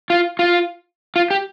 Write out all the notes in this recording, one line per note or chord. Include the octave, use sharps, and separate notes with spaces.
F4
F4
F4
G4